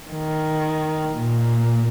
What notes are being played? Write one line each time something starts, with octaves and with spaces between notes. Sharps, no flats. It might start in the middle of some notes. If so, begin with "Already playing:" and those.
D#3
A#2